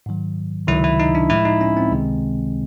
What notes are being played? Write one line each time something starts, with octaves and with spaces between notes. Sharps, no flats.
G#2 D#3 F#3
C#2 C3 D#3 F#3 E4
E4
D#4
D4
A2 F3 G#3 E4
D#4
C#4
C4
C#2 C3 D#3 G#3